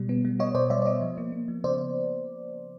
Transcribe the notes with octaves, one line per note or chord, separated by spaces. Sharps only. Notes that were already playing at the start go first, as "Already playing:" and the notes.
Already playing: B2 G3
B3
G3
B3 C#5 D#5
B2 C5 D5
G3 D5 E5
D5
B3 C#5 D#5
F3
A#3
A#3
F3
C#3 C5 D5